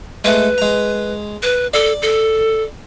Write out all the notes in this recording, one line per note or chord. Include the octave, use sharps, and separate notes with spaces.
G#3 A3 B4
G#3 A#5
B4
A4 D5
A4